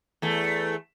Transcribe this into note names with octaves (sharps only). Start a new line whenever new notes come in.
E2 A3